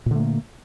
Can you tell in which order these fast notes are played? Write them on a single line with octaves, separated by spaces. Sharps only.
A#2 D3 A3 A#3